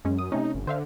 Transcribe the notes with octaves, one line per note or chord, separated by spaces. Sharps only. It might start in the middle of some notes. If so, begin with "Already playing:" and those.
F#2 G#3 C#4
D#6
C3 A3 C#4 D#4
G1
D3 C5 E5 F5